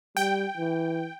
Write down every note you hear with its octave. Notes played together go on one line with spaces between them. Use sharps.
G3 G5
E3